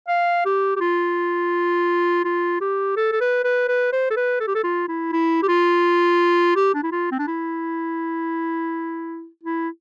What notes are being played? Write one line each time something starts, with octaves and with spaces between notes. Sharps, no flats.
F5
G4
G4
F4
F4
G4
A4
A4
B4
B4
B4
C5
A4
B4
A4
G4
A4
F4
E4
E4
G4
F4
G4
D4
E4
F4
C4
D4
E4
E4